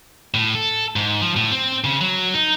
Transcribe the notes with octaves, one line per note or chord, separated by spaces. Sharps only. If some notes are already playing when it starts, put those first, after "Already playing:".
A2
A4
G#2
F3
A2
C4
C#3
F#3
D#4